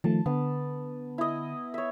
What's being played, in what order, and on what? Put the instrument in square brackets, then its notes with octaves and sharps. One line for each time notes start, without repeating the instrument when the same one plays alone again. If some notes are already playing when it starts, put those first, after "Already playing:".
[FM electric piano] D#3 F3 A3 [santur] A5
[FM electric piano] D3 [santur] B3
[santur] E4 D#5
C#5 E5